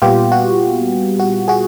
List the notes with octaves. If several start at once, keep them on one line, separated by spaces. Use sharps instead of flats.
A#2 G3 B3 F4 G4
F#4
F#4
F#4 G#4